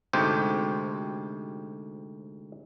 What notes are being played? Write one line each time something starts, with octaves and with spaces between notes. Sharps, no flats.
D2 G#2 C3 G4 C5